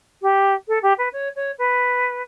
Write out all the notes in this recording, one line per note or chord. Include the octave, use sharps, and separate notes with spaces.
G4
A4
G4
B4
C#5
C#5
B4